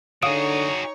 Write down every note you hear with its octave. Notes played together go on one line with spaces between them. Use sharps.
D3 D#4 F#4 G#4 C#5 F5 D#6 D7